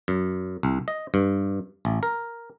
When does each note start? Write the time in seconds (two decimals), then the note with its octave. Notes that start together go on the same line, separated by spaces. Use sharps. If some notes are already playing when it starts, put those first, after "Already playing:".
0.08 F#2
0.63 C2
0.88 D#5
1.14 G2
1.85 A1
2.03 A#4